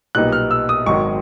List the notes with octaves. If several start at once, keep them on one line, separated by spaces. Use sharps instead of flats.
B1 A#2 G3 B3 D#4 F#6
F6
E6
D#6
G#1 G#2 D#3 F#3 C#6